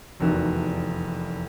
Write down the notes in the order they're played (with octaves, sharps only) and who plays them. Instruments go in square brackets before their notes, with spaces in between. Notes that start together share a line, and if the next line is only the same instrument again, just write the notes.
[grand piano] F1 E2 D#3 F#4